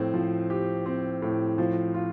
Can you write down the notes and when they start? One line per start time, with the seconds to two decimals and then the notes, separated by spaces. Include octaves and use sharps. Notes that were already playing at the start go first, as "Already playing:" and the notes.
Already playing: A2 F3 C4
0.14 F3
0.50 G4
0.86 C4
1.22 A2
1.58 F3
1.94 F4